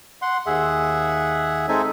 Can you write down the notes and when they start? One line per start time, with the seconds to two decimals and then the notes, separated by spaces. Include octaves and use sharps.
0.22 F#5 C6
0.46 D#2 G#4 E5 F#5
1.68 G#3 C4 D#4 A4 E5 G#5